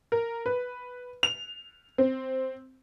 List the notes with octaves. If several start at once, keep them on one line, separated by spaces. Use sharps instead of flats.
A#4
B4
F7
C4